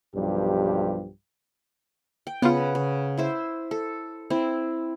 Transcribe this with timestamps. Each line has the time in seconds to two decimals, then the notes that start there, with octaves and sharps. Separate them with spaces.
0.15 B1 G2 F3 G4
2.27 G5
2.42 C#3 B3 F4 B4 F#5
2.75 C#3
3.17 E4 C5 E5
3.71 A4
4.30 C4 E4